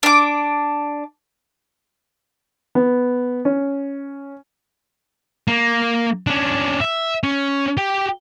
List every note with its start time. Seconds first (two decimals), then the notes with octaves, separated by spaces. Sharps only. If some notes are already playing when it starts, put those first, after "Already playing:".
0.03 D4 D6
2.75 B3
3.45 C#4
5.47 A#3
6.27 C#4 D4
6.81 E5
7.23 C#4
7.77 G4